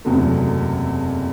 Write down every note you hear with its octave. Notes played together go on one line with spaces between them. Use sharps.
F#1 E2 C3 F#3 A3